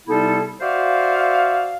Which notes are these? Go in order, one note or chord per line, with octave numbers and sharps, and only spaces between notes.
C3 G3 B3 D#4 E4 A4
F#4 C5 D5 E5 F5